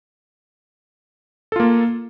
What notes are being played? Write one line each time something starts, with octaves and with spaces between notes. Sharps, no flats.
A#3 F4 A4